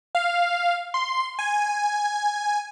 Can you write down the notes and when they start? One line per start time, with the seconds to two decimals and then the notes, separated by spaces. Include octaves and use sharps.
0.15 F5
0.94 C6
1.39 G#5